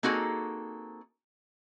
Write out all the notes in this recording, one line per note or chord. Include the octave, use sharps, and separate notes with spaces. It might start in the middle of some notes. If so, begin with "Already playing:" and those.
A#3 C4 D#4 F#4 G#4 A4